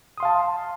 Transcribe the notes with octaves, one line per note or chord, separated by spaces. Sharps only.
F5 A5 C6 D#6